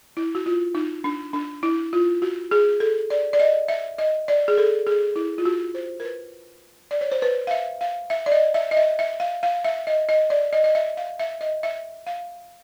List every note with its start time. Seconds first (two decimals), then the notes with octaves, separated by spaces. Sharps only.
0.17 E4
0.35 F#4
0.46 F4
0.75 D#4
1.04 D4
1.33 D4
1.63 E4
1.93 F4
2.22 F#4
2.51 G#4
2.80 A4
3.10 D5
3.33 D5
3.40 D#5
3.68 E5
3.98 D#5
4.28 D5
4.48 G#4
4.58 A4
4.87 G#4
5.16 E4
5.38 F4
5.45 F#4
5.75 C5
6.00 A#4
6.05 B4
6.91 D5
7.01 C#5
7.12 C5
7.22 B4
7.47 F5
7.51 E5
7.81 F5
8.10 E5
8.26 D5
8.32 D#5
8.54 E5
8.71 D#5
8.77 E5
8.99 E5
9.20 F5
9.43 F5
9.65 E5
9.87 D#5
10.09 D#5
10.30 D5
10.53 D#5
10.64 D#5
10.75 E5
10.97 F5
11.19 E5
11.41 D#5
11.63 E5
12.07 F5